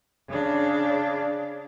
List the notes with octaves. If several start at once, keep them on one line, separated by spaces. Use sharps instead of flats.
C#3 D4